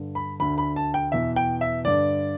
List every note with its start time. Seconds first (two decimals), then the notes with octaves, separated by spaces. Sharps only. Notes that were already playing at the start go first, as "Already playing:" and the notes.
Already playing: G2 D3
0.15 B5
0.39 D2 D3 B5
0.58 B5
0.76 A5
0.94 G5
1.12 E2 B2 E5
1.36 G5
1.61 E5
1.84 G2 D3 D5